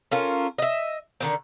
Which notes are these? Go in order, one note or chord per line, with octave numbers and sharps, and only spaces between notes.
C#4 F4 A4 A#4
D#5 E5
D3 D#3 C4